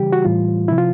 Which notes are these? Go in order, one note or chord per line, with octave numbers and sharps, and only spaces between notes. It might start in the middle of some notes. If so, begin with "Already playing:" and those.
Already playing: C#3 E3 G3 G4
F#4
A2 E3 G3 F4
C3 F3 E4
F4